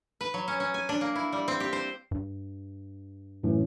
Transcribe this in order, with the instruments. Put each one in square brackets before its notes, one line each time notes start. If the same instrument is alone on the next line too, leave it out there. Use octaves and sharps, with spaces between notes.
[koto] B4
F#3
C#4
C#4
G#5
D4
A#3
E4
G3
C4
G4
C5
[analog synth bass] G2
[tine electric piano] F#2 A2 E3